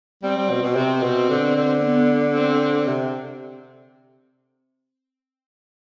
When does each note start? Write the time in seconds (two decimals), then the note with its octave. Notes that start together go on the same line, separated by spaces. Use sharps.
0.23 G3 C4
0.37 G3
0.50 B2
0.63 B2
0.76 C3 C4
1.03 B2
1.29 D3
1.56 D3
1.82 B3
2.34 C4
2.88 C3